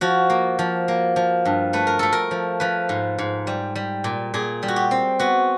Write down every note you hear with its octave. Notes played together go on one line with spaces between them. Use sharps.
F3 F#4
A#3
F3
A#3
F3
G2
A3 B4
A#4
A3 A4
A#4
F3
F3 B4
G#2
G#2
G3
G3
A#2
A#2 G#4
G3
F#4
G4
C4
B3 F#4